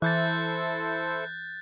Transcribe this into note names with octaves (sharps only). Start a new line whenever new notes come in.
E3 E4 A4 C5 F#6 G6 A6